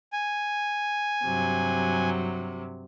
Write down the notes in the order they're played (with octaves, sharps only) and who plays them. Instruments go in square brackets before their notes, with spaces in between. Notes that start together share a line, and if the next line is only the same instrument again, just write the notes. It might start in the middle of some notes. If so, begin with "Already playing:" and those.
[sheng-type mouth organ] G#5
[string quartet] G2 C3 F#3